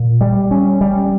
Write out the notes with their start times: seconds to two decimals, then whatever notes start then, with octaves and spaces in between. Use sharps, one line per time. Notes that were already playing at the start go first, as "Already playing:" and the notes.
Already playing: A#2
0.21 G3
0.51 C#4
0.81 G3